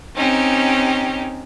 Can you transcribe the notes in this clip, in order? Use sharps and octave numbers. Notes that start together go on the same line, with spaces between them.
C4 C#4 D#4 G4